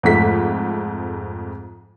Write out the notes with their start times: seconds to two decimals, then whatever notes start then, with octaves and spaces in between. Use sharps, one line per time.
0.03 F2 G#2 A3 B6